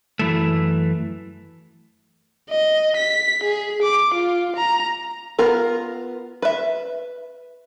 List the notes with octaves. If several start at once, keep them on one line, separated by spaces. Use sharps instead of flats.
F#2 E3 A3
D#5
B6
G#4
D6
F4
A#5
B3 F4 A#4
B4 E5